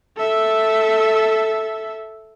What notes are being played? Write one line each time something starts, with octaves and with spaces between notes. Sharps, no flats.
A4 E5